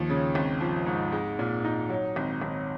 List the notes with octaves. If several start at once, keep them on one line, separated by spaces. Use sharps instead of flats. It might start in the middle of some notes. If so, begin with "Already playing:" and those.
Already playing: D#2 F3
C#3
G#1
F3
G#2
G#3
A#2
D#4
F#3
G#1
G#1